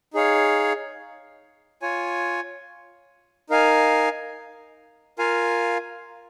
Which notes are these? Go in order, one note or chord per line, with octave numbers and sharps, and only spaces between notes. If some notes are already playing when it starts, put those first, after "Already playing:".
D#4 G#4 C#5 F5
F4 C#5 G#5
D#4 A#4 F5 G#5
F4 A#4 F5 G#5